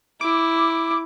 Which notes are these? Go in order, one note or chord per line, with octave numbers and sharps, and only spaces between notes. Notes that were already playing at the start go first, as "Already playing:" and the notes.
E4 D6